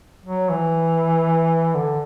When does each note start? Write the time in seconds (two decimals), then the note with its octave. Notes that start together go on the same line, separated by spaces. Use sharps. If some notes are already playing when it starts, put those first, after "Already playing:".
0.25 F#3
0.50 E3
1.74 D3